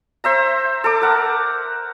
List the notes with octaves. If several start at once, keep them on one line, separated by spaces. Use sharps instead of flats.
C5 E5 A#5
A4 D6
A#4 F#5